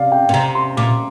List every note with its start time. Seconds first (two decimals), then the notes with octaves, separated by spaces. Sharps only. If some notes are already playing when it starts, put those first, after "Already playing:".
Already playing: C3 D5 F5
0.12 G5
0.29 A#2
0.33 C3 A#5
0.55 C6
0.77 A#2 D6